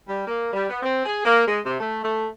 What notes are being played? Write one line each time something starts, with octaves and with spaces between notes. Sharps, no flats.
G3
A#3
G3
B3
C4
G#4
A#3
G#3
C3
A3
A3